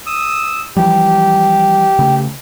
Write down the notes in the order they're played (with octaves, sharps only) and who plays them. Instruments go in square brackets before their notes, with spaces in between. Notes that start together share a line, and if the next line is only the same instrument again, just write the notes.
[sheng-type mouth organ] D#6 E6
[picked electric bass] E3 F3 G3 [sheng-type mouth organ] G4
[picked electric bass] C#3 A3